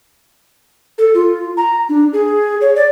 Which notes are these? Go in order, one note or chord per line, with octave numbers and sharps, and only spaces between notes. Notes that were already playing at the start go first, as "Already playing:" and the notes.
A4
F4
A#5
D4
G#4
C#5
D5